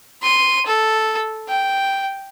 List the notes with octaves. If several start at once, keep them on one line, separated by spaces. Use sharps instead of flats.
C6 D#7
A4
G5